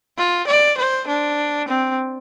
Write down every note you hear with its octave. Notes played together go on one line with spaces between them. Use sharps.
F4
D5
C5
D4
C4